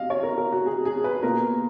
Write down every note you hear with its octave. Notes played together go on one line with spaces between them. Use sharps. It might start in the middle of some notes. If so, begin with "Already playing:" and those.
Already playing: B2 D#5 F5
C#5
A#4
A#4
F#4
G#4
G#4
B4
B2 A#3 F4 A#4